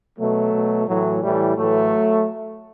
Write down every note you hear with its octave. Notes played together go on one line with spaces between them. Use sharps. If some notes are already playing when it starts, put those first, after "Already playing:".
B2 F#3 A3
B2
A2 E3 F#3
A2 E3 G3
A2 E3 F#3 A3